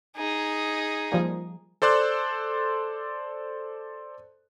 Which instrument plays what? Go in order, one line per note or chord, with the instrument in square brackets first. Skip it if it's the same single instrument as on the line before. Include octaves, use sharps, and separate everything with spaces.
[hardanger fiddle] D#4 G#4
[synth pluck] F3 G3 A#3
[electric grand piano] A4 C5 D5 C6 F#6